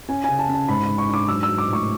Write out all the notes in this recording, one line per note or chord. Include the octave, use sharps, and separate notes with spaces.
C#4 G#5
C#3 G#5
A5
C#4
A5
G#2 B5
B5
G#2
C#6
D4 D6
F#3 E6
E6
F#3
D6
A2 C#6